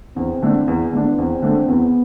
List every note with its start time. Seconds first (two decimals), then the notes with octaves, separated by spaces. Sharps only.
0.16 E2 C4
0.42 D3 A3 D4
0.67 E2 B3
0.93 D3 A3 D4
1.18 E2 C4
1.42 D3 A3 D4
1.68 E2 B3